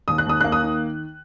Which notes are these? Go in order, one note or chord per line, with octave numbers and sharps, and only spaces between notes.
D#2 D#6
F#6
D#2 D#6
A#3 F#6
D#6
D#3